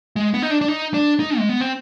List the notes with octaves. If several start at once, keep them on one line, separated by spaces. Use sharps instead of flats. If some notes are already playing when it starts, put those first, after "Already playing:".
G#3
B3
D#4
D4
D4
D#4
D4
D#4
G#3
B3
C4